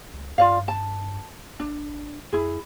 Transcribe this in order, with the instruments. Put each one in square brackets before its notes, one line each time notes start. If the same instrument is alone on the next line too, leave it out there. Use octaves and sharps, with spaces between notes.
[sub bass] C#2
[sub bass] G2 [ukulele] F4 D5 F5
[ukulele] A5
[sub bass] G#1 [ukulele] D4
[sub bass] F2 [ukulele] E4 G#4